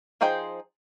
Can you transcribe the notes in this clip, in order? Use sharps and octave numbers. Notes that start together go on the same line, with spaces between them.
F3 D#4 G#4 C5 G5